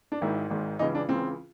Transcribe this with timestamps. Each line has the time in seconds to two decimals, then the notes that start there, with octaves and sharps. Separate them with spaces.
0.12 D4
0.21 G#1 G#2 D#3 E4
0.50 G#1 G#2 D#3
0.79 C#2 C#3 E3 D#4
0.95 D4
1.09 C#2 C#3 E3 C4